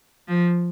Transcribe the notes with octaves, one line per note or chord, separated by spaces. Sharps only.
F3